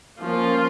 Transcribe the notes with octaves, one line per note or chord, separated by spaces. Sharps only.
F3 A#3 C#4 F4